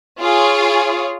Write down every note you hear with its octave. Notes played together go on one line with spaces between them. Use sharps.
F4 G#4 C#5